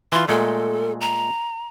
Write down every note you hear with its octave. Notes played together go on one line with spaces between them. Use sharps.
E3 F4 C6
A#2 G#3 A3 A4
A#5